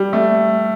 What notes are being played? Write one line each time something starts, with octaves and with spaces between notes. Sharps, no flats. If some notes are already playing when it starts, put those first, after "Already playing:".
Already playing: G3
A3